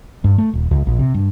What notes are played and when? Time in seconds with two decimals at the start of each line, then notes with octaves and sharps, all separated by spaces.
0.24 G2
0.38 A3
0.53 D#1
0.71 C#2
0.87 A#1
0.99 C3
1.14 G2